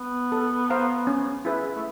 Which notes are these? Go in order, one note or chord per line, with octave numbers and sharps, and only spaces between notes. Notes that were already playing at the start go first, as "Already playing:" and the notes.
Already playing: B3
A4
C5 F5 A#5
C#4
E4 G#4 B4 E5
A3